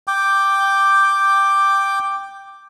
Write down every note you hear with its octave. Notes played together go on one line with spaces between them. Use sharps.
G5 D6